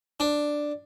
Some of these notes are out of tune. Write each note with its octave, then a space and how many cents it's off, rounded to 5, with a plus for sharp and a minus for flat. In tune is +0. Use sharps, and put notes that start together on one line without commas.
D4 +5